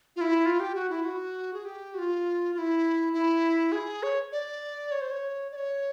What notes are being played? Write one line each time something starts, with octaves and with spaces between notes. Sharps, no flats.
F4
E4
F4
G4
F#4
E4
F#4
G#4
G4
F#4
F4
F4
E4
E4
G#4
C#5
D5
C#5
C5
C#5
D5
C#5